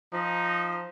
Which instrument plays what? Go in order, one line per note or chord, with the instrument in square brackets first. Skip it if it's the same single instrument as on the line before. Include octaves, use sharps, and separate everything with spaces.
[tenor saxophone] F3 [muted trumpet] D#4